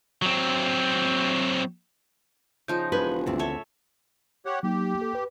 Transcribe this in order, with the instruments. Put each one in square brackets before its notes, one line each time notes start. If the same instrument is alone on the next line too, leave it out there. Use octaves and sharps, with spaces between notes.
[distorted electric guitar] F#3 C4
[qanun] C#3 F3 D#4 [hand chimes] G6
[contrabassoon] E1 [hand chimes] E4 F4 G4 [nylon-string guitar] B4 [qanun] G#5
[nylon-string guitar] D2 C4
[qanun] A4 C#5 E5 [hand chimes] A5
[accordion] G4 C#5 F#5
[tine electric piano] F#3 A#3 D#4 [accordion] G4
[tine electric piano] A#3 A4
B4